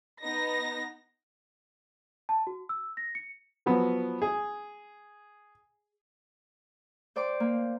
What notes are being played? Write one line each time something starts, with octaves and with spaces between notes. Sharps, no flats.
B3 D#4 A#6
A5
F#4
E6
A#6
C#7
F3 F#3 B3
G#4
C5 D5 G5 C6 D6
A#3